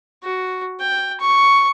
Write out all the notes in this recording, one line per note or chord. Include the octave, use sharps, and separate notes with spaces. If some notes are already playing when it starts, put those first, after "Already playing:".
F#4
G5
C#6